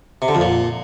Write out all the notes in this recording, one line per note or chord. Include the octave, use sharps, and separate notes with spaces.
C3
D3
F2
A#2